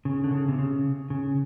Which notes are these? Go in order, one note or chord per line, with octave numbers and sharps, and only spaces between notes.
C#3
D3
C#3
C3
C#3
C#3